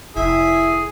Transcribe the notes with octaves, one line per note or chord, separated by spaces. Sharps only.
F1 E4 G#4